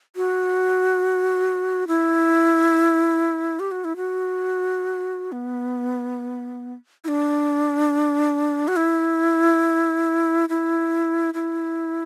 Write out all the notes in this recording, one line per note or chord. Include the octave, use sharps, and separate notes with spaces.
F#4
E4
G4
F#4
E4
F#4
B3
E4
D4
F#4
E4
E4
E4